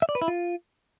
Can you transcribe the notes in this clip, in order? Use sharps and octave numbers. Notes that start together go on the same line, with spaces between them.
E5
D5
B4
E4
F4